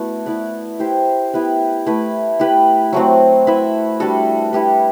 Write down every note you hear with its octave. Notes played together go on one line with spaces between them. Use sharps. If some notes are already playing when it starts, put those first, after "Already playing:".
Already playing: A3 B3 E4 F#4 D5
B3 E4 B4 D5
E4 G4 C5 E5
B3 E4 G4 B4
A3 E4 B4
E4 G4 B4
F#3 A3 C4 F#4
E4 B4 E5
G3 D4 F#4 A4
E4 G4 B4